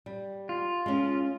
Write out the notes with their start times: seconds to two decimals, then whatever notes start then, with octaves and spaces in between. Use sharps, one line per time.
0.06 G3
0.49 F4
0.86 G#3 C#4